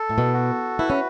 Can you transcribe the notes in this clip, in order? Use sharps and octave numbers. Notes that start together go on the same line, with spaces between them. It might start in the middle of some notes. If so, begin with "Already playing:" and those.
Already playing: A4
A2
B2
F#4
E4 B4
C#4